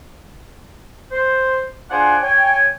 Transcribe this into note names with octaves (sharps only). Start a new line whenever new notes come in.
C5
D4 F4 G#4 C5 F#5 G#5
C#5 G5 G#5